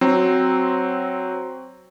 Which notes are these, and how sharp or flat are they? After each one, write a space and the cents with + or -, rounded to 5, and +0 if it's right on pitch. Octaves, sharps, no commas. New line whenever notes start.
F#3 +0 C4 +0 C5 +0